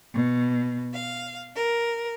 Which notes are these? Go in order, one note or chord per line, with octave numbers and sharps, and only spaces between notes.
B2
F5
A#4